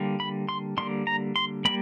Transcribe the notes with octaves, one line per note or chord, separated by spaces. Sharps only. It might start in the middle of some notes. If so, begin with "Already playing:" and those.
Already playing: D3 G3 A#3
B5
C6
D3 G3 A#3 C6
A#5
C6
G3 A#3 B5